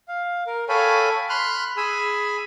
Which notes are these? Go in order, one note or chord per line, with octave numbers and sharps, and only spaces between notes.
F5
A#4
A4 C#5 F5 G5 G#5 B5
B5 C6 F6 F#6
G#4 G#5 B5 E6